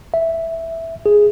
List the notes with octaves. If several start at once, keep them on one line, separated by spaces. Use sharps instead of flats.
E5
G#4